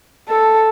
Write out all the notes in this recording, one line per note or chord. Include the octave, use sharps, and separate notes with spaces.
A4